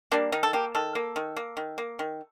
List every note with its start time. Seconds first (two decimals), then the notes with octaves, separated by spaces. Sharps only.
0.11 G3 A#3 D4
0.32 D#3 D#4
0.43 A4
0.53 A#3 G4
0.75 D#3 A4
0.95 A#3
1.16 D#3
1.37 A#3
1.57 D#3
1.78 A#3
1.99 D#3